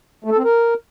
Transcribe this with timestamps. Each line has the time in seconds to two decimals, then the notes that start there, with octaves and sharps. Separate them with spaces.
0.24 A3
0.31 A4
0.38 C4
0.44 A#4